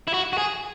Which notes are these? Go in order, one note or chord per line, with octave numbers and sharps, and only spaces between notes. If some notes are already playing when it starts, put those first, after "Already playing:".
E4
F#4
F#4
G#4